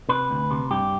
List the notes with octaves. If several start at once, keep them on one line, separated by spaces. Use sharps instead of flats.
C3 B4
D2
C3
G2 G4